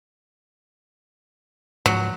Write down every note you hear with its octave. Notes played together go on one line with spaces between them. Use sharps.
G#2 F3 F#3